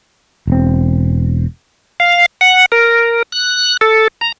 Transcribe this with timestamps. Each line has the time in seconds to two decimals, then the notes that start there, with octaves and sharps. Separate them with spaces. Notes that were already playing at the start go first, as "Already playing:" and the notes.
0.47 E1 C4
2.00 F5
2.41 F#5
2.72 A#4
3.32 F#6
3.81 A4
4.21 A#5